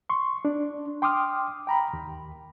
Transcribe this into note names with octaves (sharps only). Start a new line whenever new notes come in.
C6 C#6
D4
G5 C6 D6 D#6 F6
G5 A#5 B5
D#2